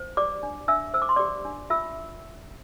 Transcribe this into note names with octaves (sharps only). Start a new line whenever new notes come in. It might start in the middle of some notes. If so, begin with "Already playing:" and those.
Already playing: C5
G4 D5 D6
D4
D4 E5 E6
C5 E6
D6
C6
G4 D5 D6
D4
F4 E5 E6